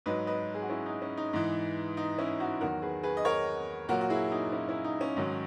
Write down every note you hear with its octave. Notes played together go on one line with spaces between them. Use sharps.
G#2 F#3 B4 D#5
B4 D#5
G#4
F#4
C#4 E4
D#4
C#4
D#4
G#2 E3
D#4
C#4 E4
D#4 F#4
E2 D#3 F#3 F#4 A#4
G#4 B4
G#4 B4
D#5
A#4 C#5
A#2 F#3 F#4 A#4
F#4
E4 G#4
D#4 F#4
C#4 E4
C#4 E4
D#4
C#4
G#2 D#3 F#3